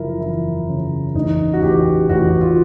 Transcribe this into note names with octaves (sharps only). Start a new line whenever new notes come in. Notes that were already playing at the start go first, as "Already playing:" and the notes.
Already playing: F#1 F3 E4 A#4
E2 E4
C#3
A1 D#4
F#4
A1 G4
A1 F#4
F4